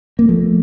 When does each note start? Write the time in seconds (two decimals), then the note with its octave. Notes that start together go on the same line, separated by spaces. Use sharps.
0.19 A#3
0.29 F3 A3